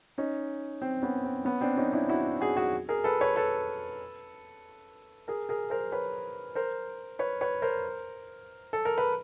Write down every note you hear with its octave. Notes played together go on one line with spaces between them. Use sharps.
C#4 D#4
C4
B3 C#4
C4
B3 C#4
C4 D4
C#4 D#4
D4 E4
E4 F#4
F#4 G#4
F#4 G#4
G#4 A#4
A4 B4
B4 C#5
A4 B4
G#4 A#4
G#4 A#4
A#4 C5
B4 C#5
A#4 C5
B4 C#5
B4 C#5
A#4 C5
A4
A#4
B4